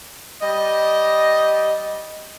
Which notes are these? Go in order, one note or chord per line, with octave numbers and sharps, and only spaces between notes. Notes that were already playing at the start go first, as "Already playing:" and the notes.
G3 D#5